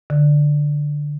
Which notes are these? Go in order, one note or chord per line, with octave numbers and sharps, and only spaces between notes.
D3